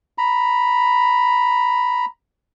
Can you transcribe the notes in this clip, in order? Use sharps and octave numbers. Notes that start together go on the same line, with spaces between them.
A#5 B5